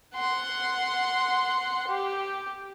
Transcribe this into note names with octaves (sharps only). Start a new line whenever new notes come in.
F#5 C6
G4